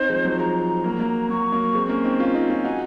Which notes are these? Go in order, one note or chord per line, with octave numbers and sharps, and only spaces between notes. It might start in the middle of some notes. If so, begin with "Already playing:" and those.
Already playing: C4 D#4 C5
F3 G#3
F#3
F3 G#3 A#5
F#3 A#3
F#3 A#3
F#3 C#6
F#3 A#3
G#3 C4
A#3 C#4
C4 D#4
C#4 F4
C4 D#4
C#4 F4
D#4 F#4 G#5